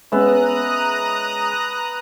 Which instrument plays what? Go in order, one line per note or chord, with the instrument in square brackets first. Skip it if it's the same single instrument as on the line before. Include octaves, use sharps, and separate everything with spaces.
[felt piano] G#3 C#4 E6 [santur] B3 E5 [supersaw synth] A#5 D#6 F#6